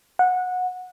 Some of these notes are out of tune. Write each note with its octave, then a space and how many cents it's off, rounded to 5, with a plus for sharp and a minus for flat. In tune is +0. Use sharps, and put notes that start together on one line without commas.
F#5 -20